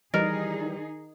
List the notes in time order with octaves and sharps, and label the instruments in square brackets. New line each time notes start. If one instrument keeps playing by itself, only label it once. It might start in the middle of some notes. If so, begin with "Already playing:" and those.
[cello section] D#3 D#4 G#4 [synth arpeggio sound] E3 G3 [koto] A#4 [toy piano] D#5